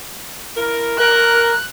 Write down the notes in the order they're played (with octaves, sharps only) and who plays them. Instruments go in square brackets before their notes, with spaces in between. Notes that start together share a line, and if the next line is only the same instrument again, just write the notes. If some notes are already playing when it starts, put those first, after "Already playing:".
[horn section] E4 A#4
[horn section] A#4 [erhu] F#6